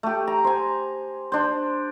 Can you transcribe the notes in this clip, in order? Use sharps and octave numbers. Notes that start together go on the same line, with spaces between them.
A3 G4
A#5
C5 G#5
D4 C5